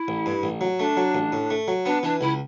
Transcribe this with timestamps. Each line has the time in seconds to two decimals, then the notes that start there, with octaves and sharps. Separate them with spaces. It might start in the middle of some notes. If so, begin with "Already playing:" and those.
Already playing: E4
0.08 A1
0.26 G2
0.43 A1
0.61 F#3
0.79 A3 D4
0.97 F#3
1.15 A1
1.32 A2
1.50 A3
1.68 F#3
1.86 B3 D4
2.03 E3 D4
2.21 C#2 E4